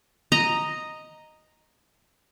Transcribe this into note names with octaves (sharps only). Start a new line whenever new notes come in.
D#5 A#5